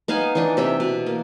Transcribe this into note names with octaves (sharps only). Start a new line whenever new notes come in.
B3 D#4 F5 G#5
E3 D4 D#4
C3 E5 G5
B2
A#3